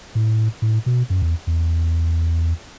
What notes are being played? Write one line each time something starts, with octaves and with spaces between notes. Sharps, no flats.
A2
A2
B2
F#2
E2
E2